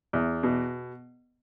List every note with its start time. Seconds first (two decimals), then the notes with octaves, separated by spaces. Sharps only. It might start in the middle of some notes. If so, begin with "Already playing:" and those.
0.13 E2
0.43 B2